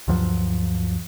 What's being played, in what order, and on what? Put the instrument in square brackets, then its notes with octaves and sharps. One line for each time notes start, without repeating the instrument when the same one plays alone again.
[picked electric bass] D2 G2 F3 F#3